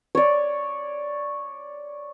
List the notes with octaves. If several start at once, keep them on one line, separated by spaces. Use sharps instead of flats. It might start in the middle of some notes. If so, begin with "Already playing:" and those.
C#5 D5